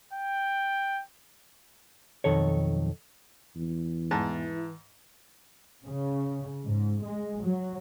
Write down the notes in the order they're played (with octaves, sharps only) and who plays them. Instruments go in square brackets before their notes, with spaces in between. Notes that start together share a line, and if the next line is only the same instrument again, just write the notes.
[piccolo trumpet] G5
[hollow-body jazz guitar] B1 F2 D#3 A4 C#5
[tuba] E2
[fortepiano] G#2 A5 [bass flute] E3
[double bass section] C#3
G#2
G#3
F#3